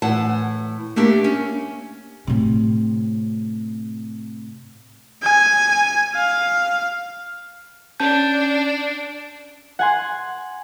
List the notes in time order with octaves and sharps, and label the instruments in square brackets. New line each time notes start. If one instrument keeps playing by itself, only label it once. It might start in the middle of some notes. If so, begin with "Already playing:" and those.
[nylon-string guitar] A2 E3 F#5 A5
A3 A#3 D4 G4 A#4
C#4
[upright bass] A2 C3
[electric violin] G#5
F5
[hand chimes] C#4 A5 G6 [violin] D4
[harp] F#5 G#5 C6